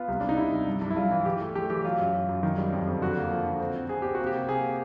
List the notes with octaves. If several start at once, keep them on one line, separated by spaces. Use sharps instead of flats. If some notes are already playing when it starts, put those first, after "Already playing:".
Already playing: B3 F4
C2
C3 D4
D#4
C2 E4
C2
G2
G2
E4
G2 F4
E3
E3 G4
A3
A3 G4
E3 G4
F#3 F4
F#2
F#3
F#2
D#3
G3
F2
F2
D3 F#4
A#3
F3
D3
C4
C4
C4 G#4
C4 G4
A#3 F#4
G4
C3
A#3 G#4